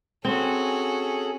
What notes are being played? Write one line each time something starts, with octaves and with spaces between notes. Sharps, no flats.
C4 C#4 F#4 G#4 A4